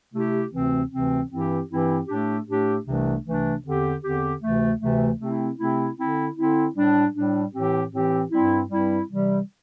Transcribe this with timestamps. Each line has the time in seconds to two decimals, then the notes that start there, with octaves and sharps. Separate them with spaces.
0.14 C3 A3 E4 G4
0.52 D2 C3 E3 C4
0.91 D2 C3 E3 C4
1.30 G2 E3 C4 E4 G4
1.70 G2 E3 C4 E4 G4
2.08 A2 A3 D4 G4
2.47 A2 A3 D4 G4
2.86 C2 C3 E3 A3 D4
3.25 C2 C3 E3 A3 D4
3.64 E2 D3 C4 G4
4.03 E2 D3 C4 G4
4.41 D2 C3 E3 A3
4.80 D2 C3 E3 A3
5.20 C3 A3 C4 E4
5.58 C3 A3 C4 E4
5.98 D3 C4 E4
6.36 D3 C4 E4
6.75 A2 G3 D4
7.14 A2 G3 D4
7.54 A2 E3 C4 G4
7.92 A2 E3 C4 G4
8.31 G2 G3 C4 E4
8.70 G2 G3 C4 E4
9.09 C3 E3 G3